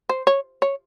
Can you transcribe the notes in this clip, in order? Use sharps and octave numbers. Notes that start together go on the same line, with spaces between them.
C5
C#5
C#5